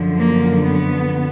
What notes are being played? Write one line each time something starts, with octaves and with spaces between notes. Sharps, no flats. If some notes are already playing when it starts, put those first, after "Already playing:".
Already playing: F#2 D3 F3
A#3
B3